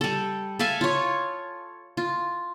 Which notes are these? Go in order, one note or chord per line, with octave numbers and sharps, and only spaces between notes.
G3 A4
A4 E5 F5 G#5
F4 C#5
F4